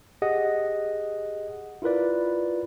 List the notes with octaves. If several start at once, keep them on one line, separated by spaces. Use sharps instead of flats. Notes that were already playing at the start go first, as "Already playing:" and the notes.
G4 G#4 D#5 F#5
E4 F4 A#4 B4 D5